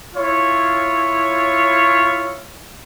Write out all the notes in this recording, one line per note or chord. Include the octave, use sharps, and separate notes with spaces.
E4 F4 C#5